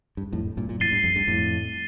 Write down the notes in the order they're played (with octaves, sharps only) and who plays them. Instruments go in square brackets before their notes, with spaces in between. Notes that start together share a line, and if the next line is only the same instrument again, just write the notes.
[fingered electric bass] G2
F2 A2
G2 A#2
A#2
[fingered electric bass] F2 A2 [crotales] A6 C7 D#7 G7
[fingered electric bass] G2
F2
G2
F2 A2